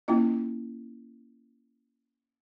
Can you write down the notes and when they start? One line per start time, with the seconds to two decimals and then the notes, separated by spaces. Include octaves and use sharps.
0.08 A#3 C#4 E4 F4 D#5